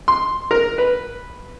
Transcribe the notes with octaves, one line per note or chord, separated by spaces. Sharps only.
C6
A#4
B4